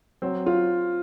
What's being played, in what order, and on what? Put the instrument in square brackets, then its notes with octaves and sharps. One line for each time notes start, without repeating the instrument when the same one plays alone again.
[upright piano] F#3 [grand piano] C4
[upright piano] F4